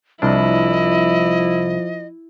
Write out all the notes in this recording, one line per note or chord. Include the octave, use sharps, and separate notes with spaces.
C2 F3 D4 E4 D#5